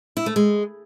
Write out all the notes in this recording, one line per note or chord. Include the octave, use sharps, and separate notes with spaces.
E4
A3
G#3